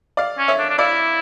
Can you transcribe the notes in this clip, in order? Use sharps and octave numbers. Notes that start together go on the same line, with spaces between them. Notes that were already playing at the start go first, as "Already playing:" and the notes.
D5 F5
C#4
C#5 E5
D4
D4
E4 D5 F5